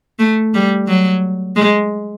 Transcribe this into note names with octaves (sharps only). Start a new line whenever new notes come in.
A3
G3
F#3
G#3